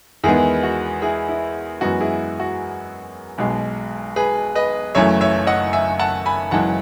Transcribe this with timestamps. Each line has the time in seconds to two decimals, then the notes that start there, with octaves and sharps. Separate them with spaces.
0.24 E2 D#3 G#3 B3 E4 G#4
0.63 F#4
1.02 E4 G#4
1.29 E4
1.81 F#2 E3 G#3 B3 F#4
2.01 E4 G#4
2.40 F#4
3.38 B1 B2 G#3
4.16 G#4 B4
4.55 B4 D#5
4.95 F#1 F#2 E3 A3 C#5 E5
5.21 C#5 E5
5.47 D#5 F#5
5.73 E5 G#5
5.99 F#5 A5
6.26 G#5 B5
6.51 F#1 F#2 E3 G#3 F#5 A5